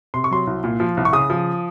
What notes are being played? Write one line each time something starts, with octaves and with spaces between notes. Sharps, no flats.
C3 C6
C#6
F#3 C6
C2
A#2
F3
C2
C#6
C#3 D#6
F3